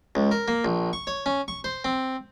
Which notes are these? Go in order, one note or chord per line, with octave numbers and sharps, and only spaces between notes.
C#2
A#4
A#3
A#1
C#6
C#5
C#4
C#6
C5
C4